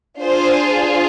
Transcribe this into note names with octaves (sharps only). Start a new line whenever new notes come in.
D4 F4 G#4 C5